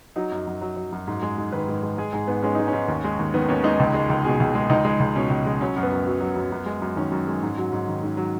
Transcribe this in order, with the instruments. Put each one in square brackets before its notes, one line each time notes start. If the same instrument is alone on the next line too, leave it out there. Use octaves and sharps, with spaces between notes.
[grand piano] F#3 D#4
F#2
F#2
F#3
F#3
F#2
G#2
G#3
G#2
D#3 B4
G#2
G#3
G#3 G#4
G#2 G#4
G#2 B3
G#3 C#4
G#3 D#4
C#4
G#2
D#2
G#3
D#2
D#3 B3
D#2 C#4
G#3 D#4
C#2
G#3
C#2
B2 G#4
C#2
G#3
C#2 D#4
G#3
C#2
B2 C#4
C#2
G#3
F#3 C#4
F#2
B3
F#2
F#3
F#3
F#2
F#2
G#3
F#2
D#3 C#4
F#2
G#3
G#2
F#3
G#2
D#3
G#2
F#3